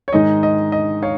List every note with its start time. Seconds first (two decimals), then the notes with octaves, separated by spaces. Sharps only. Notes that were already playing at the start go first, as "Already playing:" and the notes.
0.08 C#5
0.13 G#2 D#3 G#3 D#4 D#5
0.43 D#5
0.72 D#5
1.03 C#5 F5